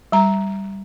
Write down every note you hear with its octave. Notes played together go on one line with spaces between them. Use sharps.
G3 A#5